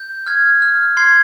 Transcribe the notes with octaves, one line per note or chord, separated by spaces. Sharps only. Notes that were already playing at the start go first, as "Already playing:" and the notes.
Already playing: G6
F6 G#6
F6
C6 G#6 C7